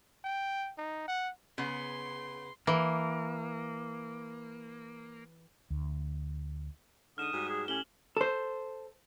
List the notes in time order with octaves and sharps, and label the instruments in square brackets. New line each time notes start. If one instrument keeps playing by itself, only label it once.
[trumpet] G5
D#4
F#5
[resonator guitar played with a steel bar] C#3 B3 [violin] C6
[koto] E3 [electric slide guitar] A#3
[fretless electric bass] D2
[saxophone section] D3 G#3 D#4 [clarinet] D#6 [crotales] F6 E7
[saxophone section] G#2 G3 F#4
[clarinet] G#4
[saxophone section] A2 G4 [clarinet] C#4 [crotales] F#7 G7
[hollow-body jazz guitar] A4 C5